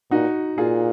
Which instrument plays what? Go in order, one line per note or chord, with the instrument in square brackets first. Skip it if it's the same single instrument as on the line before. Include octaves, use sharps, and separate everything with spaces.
[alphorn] A#2 [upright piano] D#4 F#4
[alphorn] A#2 [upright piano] F4 G#4